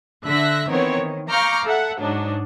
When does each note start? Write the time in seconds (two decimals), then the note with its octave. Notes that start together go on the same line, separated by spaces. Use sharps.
0.24 D3 E5 F#6 A#6 B6
0.68 D#3 E3 B3 C4 A#4 C#5
1.01 D#3
1.30 F5 A#5 C#6 D6 F6 G6
1.66 A4 E5 F#5
1.99 G#2 F#3 D4 D#4